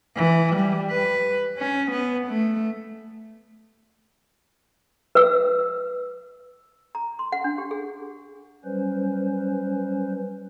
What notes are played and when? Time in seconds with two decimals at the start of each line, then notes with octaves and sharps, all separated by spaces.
0.17 E3
0.56 G3
0.91 B4
1.58 C#4
1.92 B3
2.28 A3
5.15 B4 E6
6.95 A#5
7.19 C6
7.32 F#5
7.44 D4
7.58 G4
7.71 G#4
8.64 F#3 G3 C#4 B4 C5